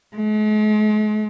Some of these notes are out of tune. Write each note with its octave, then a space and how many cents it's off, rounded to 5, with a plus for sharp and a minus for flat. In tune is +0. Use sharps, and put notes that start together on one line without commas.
G#3 +45